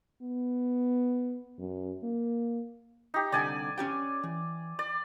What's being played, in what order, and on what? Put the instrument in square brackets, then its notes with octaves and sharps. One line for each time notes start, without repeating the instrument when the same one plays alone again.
[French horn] B3
F#2
A#3
[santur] D#4 G4
[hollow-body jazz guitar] C2 D3 G5 [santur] D5 G#5
[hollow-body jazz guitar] C#4 G4 G5
E3
[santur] D5